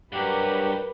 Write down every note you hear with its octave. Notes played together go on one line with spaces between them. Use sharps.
G2 F#3 G4 A#4 B4 F#5